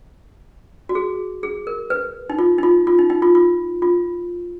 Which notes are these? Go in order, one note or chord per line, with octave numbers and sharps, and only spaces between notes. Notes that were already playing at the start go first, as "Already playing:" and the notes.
F#4
G#4
G#4
A#4
B4
D#4
F4
D#4
F4
F4
D#4
D#4
F4
F4
F4